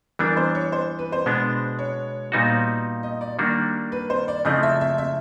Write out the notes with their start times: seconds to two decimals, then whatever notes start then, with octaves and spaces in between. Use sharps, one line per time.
0.19 E3 G3 B3 D4 A#4
0.37 C5
0.55 C#5
0.72 C5
0.99 B4
1.12 C5
1.26 B2 G#3 B3 D4
1.79 C#5
2.32 A#2 G3 B3 D#4 F#4
3.03 D#5
3.21 D5
3.39 D#3 G3 A#3 D4 F#4
3.92 B4
4.10 C5
4.28 D5
4.45 C#3 F3 A3 C4 E4 D#5
4.63 E5
4.81 E5
4.98 E5